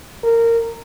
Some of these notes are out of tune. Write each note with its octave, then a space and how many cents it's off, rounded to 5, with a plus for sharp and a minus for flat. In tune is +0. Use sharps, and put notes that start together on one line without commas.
A#4 -15